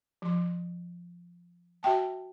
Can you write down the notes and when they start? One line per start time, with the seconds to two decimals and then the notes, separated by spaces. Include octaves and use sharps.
0.22 F3 C6
1.83 F#4 E5 G5 A5